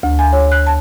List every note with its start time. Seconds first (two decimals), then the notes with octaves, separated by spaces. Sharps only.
0.03 D2
0.19 G#5
0.32 C#5
0.52 F#6
0.67 A5